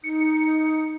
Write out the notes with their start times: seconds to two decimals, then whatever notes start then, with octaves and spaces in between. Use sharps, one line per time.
0.04 D#4 C#7